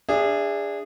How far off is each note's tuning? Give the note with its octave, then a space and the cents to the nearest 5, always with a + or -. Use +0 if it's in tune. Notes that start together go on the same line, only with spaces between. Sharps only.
D4 +0 G#4 -20 E5 +25